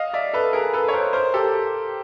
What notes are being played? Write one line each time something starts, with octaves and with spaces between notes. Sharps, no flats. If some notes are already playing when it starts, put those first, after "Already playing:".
Already playing: D#5 F5
D5 E5
A4 B4
G#4 A#4
A4 B4
C#5
A#4 C5
A#4 C5
G4 A4